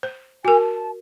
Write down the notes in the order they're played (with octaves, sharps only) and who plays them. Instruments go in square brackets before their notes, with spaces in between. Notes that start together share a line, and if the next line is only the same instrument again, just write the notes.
[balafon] C5
[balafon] F#4 A#4 [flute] G#5
[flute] A5